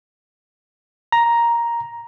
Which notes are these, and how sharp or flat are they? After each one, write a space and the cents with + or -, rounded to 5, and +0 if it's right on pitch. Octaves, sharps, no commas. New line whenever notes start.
A#5 +5